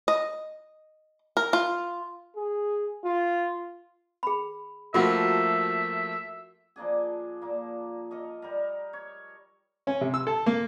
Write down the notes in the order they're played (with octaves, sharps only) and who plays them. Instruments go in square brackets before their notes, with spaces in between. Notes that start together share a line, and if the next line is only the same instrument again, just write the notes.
[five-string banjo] D#5
A#4
F4
[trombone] G#4
F4
[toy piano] G#4 B5
[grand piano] F3 A3 A#3 [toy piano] F4 F#4 F#5 [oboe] E5
[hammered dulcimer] F3 A#3 D4 G#4
A#2 A#3
A4 A#4 D#5
G3 A4 A#4
C#5
[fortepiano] C#4
C3
E6
A4
A#3